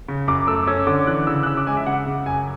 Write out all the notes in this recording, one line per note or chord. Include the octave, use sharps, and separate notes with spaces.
C#3
F#2 D6
A3 E6
C#4 E6
D3 D6
E3 F#6
C#3 E6
F#6
C#4 E6
D6
G#3 G#5
E5
C#3 F#5
C#3
F#2 G#5